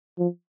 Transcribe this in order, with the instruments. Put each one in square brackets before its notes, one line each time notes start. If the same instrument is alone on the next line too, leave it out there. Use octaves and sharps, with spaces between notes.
[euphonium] F3